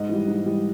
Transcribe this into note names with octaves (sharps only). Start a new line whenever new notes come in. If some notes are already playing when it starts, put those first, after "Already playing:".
Already playing: G#2 D#5
E3 G3
G#2
E3 G3